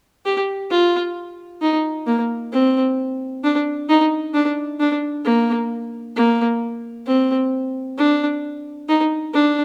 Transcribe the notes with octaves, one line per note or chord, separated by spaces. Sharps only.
G4
F4
D#4
A#3
C4
D4
D#4
D4
D4
A#3
A#3
C4
D4
D#4
D4